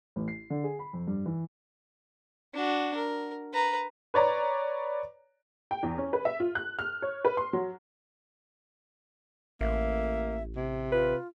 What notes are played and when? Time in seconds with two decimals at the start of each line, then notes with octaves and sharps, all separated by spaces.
0.16 A1
0.28 C7
0.50 D3
0.64 G#4
0.79 B5
0.93 F2
1.07 G2
1.26 E3
2.54 D4 F#4
2.96 A#4
3.53 B4 A#5
4.14 B4 C#5 D5 A#5
5.71 G5
5.83 E2
5.98 C#4
6.13 B4
6.25 E5
6.40 F4
6.55 F#6
6.79 F6
7.02 C#5
7.25 B4
7.37 C6
7.53 F#3
9.61 A1 A#3 E5
10.56 C3
10.92 F4 B4